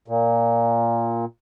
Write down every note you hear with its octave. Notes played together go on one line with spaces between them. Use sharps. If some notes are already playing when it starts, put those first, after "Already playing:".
A#2